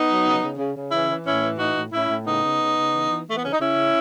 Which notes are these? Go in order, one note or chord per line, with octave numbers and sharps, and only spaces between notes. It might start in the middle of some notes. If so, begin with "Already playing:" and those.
Already playing: B3 D#4
F#3
C#3
C#3
C#3
C#3
E3 C#4 E4
E3
A2 C#4 E4
E3
A2 D#4 F#4
A2
A2 C#4 E4
A2
C#3 B3 D#4
C#3
C#3
C#3
E3
E3
E3 A3
B3
C#3 C#4
D#4
C#3 C#4 E4
C#3